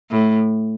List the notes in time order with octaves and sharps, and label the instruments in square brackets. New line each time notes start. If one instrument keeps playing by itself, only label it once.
[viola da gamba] A2